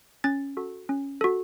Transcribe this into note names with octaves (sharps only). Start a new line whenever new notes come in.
C#4 A6
F#4 A4
C#4
F#4 A4